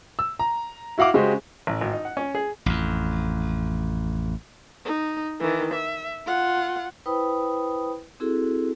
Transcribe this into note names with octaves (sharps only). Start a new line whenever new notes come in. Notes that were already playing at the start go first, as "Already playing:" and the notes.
E6
A#5
E4 F#4 F5 F#5 D6
C#3 G#3 F#4 G4 C5
A1
G#1
D#4
F#5
C#4
G#4
A1 F2
D#4
D#3 E3
E5
F4 F#5
E4 B4 C5 G5 B5 D#6
C4 E4 F#4 G#4 A4